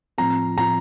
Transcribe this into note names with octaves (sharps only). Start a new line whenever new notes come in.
A2 F3 C4 F4 A#5
A2 F3 C4 F4 A#5